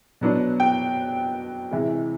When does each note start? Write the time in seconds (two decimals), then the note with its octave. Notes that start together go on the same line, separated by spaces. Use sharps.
0.21 B2 F#3 B3 D4
0.60 G5
1.71 C3 E3 G#3